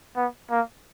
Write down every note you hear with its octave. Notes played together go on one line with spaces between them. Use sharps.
B3
A#3